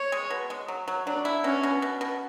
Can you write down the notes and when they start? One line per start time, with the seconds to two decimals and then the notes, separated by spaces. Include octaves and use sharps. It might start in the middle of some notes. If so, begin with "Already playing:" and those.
Already playing: C#5
0.12 G#3
0.30 B2
0.50 G#3
0.68 F#3
0.88 F#3
1.06 F#3 D4
1.25 E4
1.44 B2 C#4
1.63 B2
1.82 B2
2.01 B2